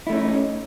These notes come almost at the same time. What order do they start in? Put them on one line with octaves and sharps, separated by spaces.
E4 A3 C#4 D#4